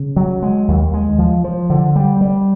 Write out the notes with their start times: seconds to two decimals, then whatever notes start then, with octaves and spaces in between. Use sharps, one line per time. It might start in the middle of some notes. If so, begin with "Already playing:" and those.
Already playing: C#3
0.16 F#3
0.42 G#3
0.68 D#2
0.94 G#3
1.19 F3
1.44 F3
1.70 D3
1.96 G3
2.21 G3